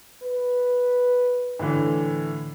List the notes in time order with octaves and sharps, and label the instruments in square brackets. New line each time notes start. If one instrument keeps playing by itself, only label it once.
[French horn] B4
[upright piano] A2 D3 E3